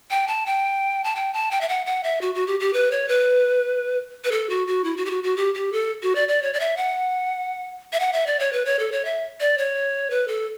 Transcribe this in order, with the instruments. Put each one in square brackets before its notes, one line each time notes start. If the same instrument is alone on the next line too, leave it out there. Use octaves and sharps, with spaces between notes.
[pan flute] G5
A5
G5
A5
G5
A5
G5
E5
F#5
F#5
E5
F#4
F#4
G4
G4
B4
C#5
B4
B4
A4
F#4
F#4
E4
F#4
G4
F#4
F#4
G4
G4
A4
F#4
D5
D5
C#5
D5
E5
F#5
E5
F#5
E5
D5
C#5
B4
C#5
A4
C#5
E5
D5
C#5
B4
A4